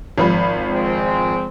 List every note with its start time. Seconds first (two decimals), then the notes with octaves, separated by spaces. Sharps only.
0.18 G#1 F3 B5
0.68 G#3 C4